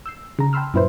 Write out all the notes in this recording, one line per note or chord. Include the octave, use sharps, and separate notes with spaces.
E6 G6 C7
C#3 A#5
G5 A5 B5 C6 E6 F6
F#2 A#2 E4 B4 C5